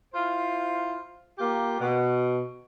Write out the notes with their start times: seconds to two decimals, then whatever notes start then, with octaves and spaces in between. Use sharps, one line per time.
0.14 E4 F4 C5
1.39 A#3 F4 G4
1.81 B2